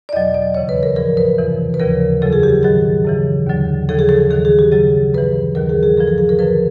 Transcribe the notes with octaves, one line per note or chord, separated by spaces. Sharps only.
D5
E2 B2 F#3 D#5
D5
D#2 C#3 E3 C#5
B4
A#4
G#2 F3 A#4
B4
F2 C3 E3
B4
D#2 C#3 F3 A#4
F2 C#3 F#3 A4
G#4
G4
G#2 D#3 F#3 G#4
F#2 C#3 E3
D#2 D3 F#3
D#2 C#3 F3 A4
G#4
A4
D#2 D#3 F#3 A4
G#4
G4
F#2 C#3 F#3 G#4
G2 E3 B4
D#2 D#3 F#3 A#4
G#4
G#4
G2 D3 F3 A4
A4
G#4
A#4
F#2 D3 F3 B4